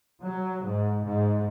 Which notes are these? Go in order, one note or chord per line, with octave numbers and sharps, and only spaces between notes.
F#3
G#2
G#2